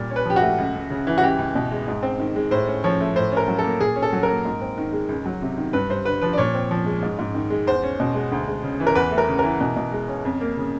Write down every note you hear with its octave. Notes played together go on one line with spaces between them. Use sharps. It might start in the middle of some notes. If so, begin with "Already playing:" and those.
Already playing: A#2 G3
C#4
B4
F3 G4
F#4
A3
C#2
C#2
C#3
E3
F#4
C#2 G4
C#2
B2
G#3
G#2
C4
D#3
G#3
A2 C5
C#4
F3 C#5
A3
A2 C5
C#4
A#4
F#3
A4
A#3
A#2 G#4
C#4
A4
F#3
A#4
A#3
G#2
C4
D#3
G#3
C#2
F#3
C3
D#3
G2 B4
G2 C5
D3 B4
F3 B4
D5
A#2 C#5
C4
F3
G#3
G#2
G#2
D#3
G#3
E2 C5
C#4
B2
G#3
D2
G#3
C#3
E3
A#4
E2 B4
A3
A#4
C#3
E3 A#4
B2
B2
G#3
C#4
F2
A#3
C#3